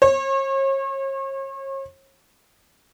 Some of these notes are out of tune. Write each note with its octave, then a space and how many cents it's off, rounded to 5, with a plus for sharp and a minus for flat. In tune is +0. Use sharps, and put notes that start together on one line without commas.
C#5 -40